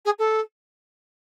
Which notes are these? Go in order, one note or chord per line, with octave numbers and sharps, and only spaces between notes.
G#4
A4